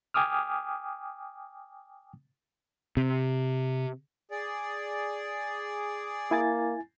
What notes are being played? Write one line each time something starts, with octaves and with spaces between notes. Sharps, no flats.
G5 G#5 D6 D#6 F6
C3
G#4 D5
A#3 E4 G#5 A6